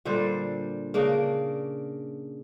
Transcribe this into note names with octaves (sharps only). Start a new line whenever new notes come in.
A#2 D3 G3 C5
C#3 A#3 D4